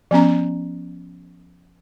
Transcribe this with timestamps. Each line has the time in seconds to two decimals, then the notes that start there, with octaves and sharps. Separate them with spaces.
0.11 F3 B3 C#4 A#5